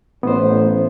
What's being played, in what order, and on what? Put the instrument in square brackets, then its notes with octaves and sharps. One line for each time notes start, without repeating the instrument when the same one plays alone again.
[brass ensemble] A1 [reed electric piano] B3 C5